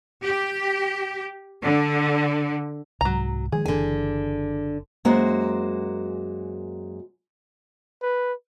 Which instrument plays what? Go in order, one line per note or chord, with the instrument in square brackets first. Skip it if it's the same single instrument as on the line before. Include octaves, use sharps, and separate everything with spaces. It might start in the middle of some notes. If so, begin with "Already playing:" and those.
[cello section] G4
D3
[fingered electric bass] C2 G#2 [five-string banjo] F#3 A#5
[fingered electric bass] D#3 F3 G#3 [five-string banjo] G#4
[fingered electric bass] F#1 E3 [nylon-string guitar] D3 G#5
[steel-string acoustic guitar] F#2 G#3 A#3 F#4 C5
[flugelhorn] B4